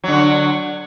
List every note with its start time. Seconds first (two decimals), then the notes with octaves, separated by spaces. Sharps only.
0.04 F#3
0.08 D3
0.12 F#4